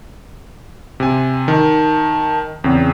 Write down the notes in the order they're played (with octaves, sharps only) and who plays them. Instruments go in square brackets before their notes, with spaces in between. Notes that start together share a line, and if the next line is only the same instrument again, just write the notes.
[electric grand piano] C3 G#5
[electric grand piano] D#3 [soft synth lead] A5
[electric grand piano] E2 C#3 [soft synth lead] C4